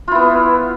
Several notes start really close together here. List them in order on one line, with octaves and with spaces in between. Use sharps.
F4 E4 B3